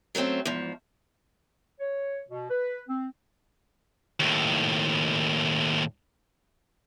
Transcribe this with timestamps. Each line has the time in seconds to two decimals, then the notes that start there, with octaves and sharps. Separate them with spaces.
0.15 F#3 A3 A#3 C4 C#4
0.45 E2 G#2 F3
1.80 C#5
2.29 B2
2.50 B4
2.89 C4
4.20 D#2 A2